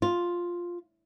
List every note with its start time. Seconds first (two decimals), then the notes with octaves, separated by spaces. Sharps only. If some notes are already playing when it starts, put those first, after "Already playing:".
0.02 F4